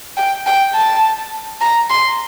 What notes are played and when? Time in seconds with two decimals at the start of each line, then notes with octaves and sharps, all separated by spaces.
0.17 G5
0.46 G5
0.74 A5
1.61 A#5
1.90 C6